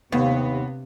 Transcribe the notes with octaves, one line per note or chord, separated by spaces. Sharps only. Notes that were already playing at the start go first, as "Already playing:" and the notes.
D#2 C3 B3